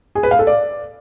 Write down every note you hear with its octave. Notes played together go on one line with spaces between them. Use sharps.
G#4
B4
F5
A4
D5